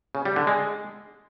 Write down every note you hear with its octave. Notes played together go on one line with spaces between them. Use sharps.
C#3
G3
D3
G#3